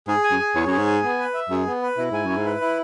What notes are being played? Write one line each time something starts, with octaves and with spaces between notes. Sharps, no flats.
G#2 G#4
G#5
F#2
G#4
E2 C#5
F#2 G#4
G#2
G#5
B3
B4
E5
F#2 G#4
B3
B4
B2 E4
G#2 G#5
F#2 E4
G#2
B4
E4